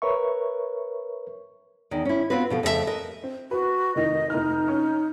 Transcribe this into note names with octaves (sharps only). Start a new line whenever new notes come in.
A#4 B4 C#5 E5 C#6
E2 D#3
C#4 E4
B3 C4 F4 F#4 B4
B2 F3 A4
F2 C#3 A3 E4 E5 A5
A#4 B4 D#5
C4
F#4 B4
F1 D#3 D#5
F1 D#4 F6
C#4